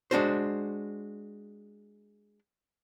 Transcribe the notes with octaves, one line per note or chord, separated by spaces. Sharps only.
G#3 D4 F#4 C5